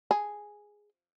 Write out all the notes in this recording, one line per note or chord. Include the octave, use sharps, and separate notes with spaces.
G#4